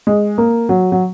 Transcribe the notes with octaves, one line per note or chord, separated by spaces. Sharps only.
G#3
A#3
F#3
F#3